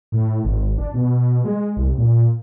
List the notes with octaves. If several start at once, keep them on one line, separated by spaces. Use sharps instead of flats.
A2
G#1
D4
B2
G#3
C2
A#2